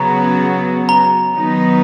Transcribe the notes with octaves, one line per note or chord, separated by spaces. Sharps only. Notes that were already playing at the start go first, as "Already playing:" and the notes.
Already playing: C#3 F#3 B3 F#4 A#5
A#5
D#3 F#3 B3 D#4